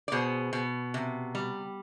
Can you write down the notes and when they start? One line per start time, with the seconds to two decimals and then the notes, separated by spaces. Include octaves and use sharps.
0.08 D5
0.12 B2 G#4 C5
0.53 B2
0.94 C3
1.35 G3